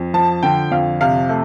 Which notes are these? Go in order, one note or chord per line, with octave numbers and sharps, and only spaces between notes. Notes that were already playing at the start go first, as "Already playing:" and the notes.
Already playing: F2
F3 A5
D3 G5
F2 F5
C3 F5
A3